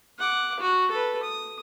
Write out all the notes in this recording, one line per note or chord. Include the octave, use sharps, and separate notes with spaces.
F#5 D6
F#4
A4 B4
D#6